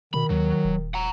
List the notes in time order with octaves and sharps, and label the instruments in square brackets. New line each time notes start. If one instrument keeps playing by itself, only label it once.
[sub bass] B2 [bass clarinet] D#3 [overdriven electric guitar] B5
[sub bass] D#2 [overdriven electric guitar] F#3
[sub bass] D#1
[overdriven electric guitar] F#5 A#5